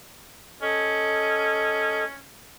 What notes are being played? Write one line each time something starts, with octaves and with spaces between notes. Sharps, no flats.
C#4 A4 D#5